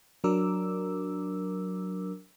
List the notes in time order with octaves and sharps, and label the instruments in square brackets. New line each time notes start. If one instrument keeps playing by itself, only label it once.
[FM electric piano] F#3 D4 A#4 D6 E6